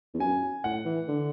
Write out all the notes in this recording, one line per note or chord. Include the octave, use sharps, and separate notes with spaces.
E2
F#2 G#5
A2 F#5
E3
D3